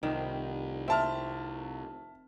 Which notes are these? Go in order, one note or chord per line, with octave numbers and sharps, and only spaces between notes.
F1 C2 D#3
C4 E5 A5 F6